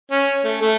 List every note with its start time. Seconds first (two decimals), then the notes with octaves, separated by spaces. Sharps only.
0.11 C#4
0.44 A3
0.61 A3